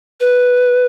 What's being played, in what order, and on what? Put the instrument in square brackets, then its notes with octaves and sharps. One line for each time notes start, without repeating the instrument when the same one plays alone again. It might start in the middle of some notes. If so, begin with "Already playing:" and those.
[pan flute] B4